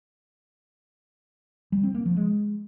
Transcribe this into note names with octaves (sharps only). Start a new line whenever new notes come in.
G3
C4
A#3
F3
G#3